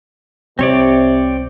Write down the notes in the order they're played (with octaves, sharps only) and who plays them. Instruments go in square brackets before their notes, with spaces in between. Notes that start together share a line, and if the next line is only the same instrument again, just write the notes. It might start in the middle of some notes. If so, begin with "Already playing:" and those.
[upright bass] C2 [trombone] C3 [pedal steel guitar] C4 C#5 D5